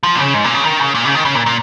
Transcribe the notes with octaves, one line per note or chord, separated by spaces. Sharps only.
F3
A#2
C#3
G#2
A#2
C#3
D#3
C#3
A#2
C#3
D#3
C#3
A#2
A#2